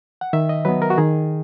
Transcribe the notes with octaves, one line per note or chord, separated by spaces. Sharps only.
F#5
D#3 E5
D#5
F#3 B3 B4
A#4
F#4
D#3 G#4